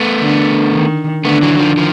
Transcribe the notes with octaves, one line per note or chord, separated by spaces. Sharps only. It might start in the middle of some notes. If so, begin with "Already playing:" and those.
Already playing: A3 B3
D3
D#3
D3 A3 B3
E3 F#3
F#3
D#3 F3
D#3 F3